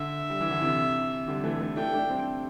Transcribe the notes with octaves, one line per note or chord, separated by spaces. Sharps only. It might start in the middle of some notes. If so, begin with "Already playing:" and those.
Already playing: D3 E5
G3
E3
D3
C3 E3
D3 G3
E3 A3
E3 A3
A3 D4 G5
A3 D4
G3 C4